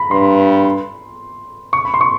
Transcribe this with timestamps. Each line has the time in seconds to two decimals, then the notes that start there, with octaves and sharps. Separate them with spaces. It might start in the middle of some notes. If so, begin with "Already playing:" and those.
Already playing: A#5 B5
0.11 G2 C6
1.73 C#6
1.85 B5
1.94 C6
2.01 C#6